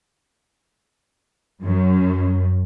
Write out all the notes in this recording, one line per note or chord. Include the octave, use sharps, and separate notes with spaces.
F#2